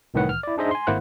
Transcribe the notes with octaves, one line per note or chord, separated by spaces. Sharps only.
C2 A2 D#3 E3 B4 F#5
F6
E4 D5
D4 D#4 G#4 C5 D#5 E5
G#5 C6
G#1 A#3 E4 C5 F#5 F#6